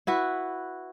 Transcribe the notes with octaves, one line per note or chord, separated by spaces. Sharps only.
E4 F#4 B4